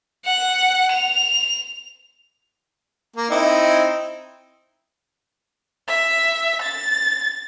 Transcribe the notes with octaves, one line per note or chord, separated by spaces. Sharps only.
F#5
F7
A#3
C4 D#4 E4
E5
A6